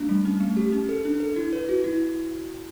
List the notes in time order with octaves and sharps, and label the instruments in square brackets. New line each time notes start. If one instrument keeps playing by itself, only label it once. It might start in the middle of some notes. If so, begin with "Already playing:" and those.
Already playing: [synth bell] A3 D4
G3
C#4
A3
G4
C#4
A4
D4
A4
E4
B4
F#4
E4